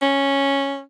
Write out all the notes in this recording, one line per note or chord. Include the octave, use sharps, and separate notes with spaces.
C#4